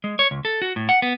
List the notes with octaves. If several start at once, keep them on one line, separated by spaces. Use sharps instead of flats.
G#3
C#5
C#2
A4
F#4
A2
F#5
B3